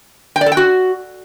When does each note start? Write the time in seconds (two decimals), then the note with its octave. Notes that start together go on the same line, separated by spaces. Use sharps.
0.36 G5
0.41 D5
0.46 A4
0.52 G5
0.57 F#4